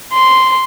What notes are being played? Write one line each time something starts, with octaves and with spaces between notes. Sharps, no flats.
C6